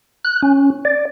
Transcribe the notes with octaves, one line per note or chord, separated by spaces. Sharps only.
F#6
C#4
D5